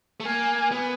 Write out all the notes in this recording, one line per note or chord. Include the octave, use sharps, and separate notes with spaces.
A3
A#3 G#5
B3